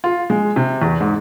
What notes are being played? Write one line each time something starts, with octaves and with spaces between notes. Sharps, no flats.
F4
G#3
C3
E2
G#2